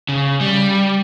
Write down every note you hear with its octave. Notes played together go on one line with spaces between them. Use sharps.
C#3
G3